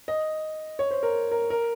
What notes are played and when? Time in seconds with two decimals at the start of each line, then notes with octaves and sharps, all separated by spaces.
0.08 D#5
0.79 C#5
0.91 C5
1.03 A#4
1.31 A#4
1.50 A#4